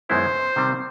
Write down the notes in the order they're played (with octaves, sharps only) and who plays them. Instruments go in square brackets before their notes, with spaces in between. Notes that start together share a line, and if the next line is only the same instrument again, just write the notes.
[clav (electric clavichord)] F#2 D#3 G#3 B3 E4 [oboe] C5
[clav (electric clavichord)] C3 D#3 G3 C4